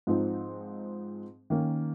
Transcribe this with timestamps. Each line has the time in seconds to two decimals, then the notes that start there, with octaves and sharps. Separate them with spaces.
0.07 G#2 F3 C4 D#4
1.50 D#3 A#3 C#4